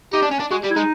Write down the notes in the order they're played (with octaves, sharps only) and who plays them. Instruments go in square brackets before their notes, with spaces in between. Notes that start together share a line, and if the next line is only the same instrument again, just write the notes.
[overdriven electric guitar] D#4 [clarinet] G4
[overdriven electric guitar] D4
C#4
D4
[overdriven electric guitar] G#3 [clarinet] F#4
[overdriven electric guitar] G3
[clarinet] E4
[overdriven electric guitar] G#3 [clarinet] D#4